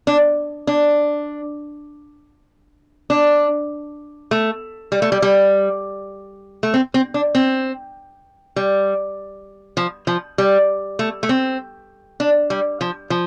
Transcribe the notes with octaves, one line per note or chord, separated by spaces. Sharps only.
D4
D4
D4
A3
G3
A3
G3
G3
A3
C4
C4
D4
C4
G3
F3
F3
G3
A3
A3
C4
D4
G3
F3
F3